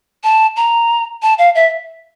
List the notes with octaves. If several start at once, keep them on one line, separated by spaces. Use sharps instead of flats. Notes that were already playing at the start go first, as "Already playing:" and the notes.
A5
A#5
A5
F5
E5